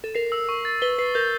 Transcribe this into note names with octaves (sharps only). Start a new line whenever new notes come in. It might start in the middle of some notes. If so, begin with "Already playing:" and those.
A4
A#4 C7
E6
C#6
A6
B4 G7
B4 C7
A#4 G6